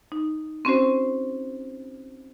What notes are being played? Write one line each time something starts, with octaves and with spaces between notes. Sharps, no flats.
D#4
C4 C#4 F#4 C5